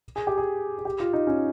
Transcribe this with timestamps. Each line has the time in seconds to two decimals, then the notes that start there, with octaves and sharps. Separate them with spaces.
0.16 G#4
0.27 G4
0.38 G#4
0.78 G#4
0.85 G4
1.00 F4
1.13 D#4
1.27 C#4